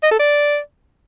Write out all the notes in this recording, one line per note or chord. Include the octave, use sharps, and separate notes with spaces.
D#5
A4
D5